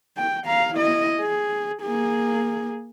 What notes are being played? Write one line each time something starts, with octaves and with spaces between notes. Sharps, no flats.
G5
F5 A#5
E4 D#5
G#4
A#3 G#4